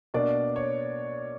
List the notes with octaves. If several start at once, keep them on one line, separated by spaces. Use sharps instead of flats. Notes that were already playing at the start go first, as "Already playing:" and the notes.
B2 A#3 D4 D5
C#5